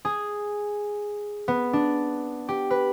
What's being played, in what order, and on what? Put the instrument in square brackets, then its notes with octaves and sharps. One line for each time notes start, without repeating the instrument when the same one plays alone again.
[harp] G#4
B3
D4
G4
B4